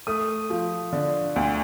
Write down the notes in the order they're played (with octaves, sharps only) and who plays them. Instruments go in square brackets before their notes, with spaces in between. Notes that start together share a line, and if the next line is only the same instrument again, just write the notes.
[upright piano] A3 D#6
F3
D3
D2